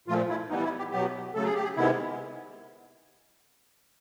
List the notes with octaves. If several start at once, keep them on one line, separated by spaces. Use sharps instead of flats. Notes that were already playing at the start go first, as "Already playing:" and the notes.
A#2 F3 A3 F4
E4
E3 G3 B3 D#4
E4
G4
B2 F#3 B3 G4
C#3 F#3 A3 A4
G#4
G4
G#4
C3 D#3 G#3 B3 E4